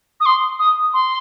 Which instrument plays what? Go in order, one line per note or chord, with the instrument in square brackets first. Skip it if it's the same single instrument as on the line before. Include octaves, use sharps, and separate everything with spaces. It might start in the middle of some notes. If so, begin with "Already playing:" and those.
[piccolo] D#6
C6
D#6
C6